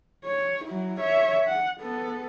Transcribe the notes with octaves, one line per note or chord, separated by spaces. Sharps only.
C#5
F#3 E4
C#5 E5
F#5
B3 A4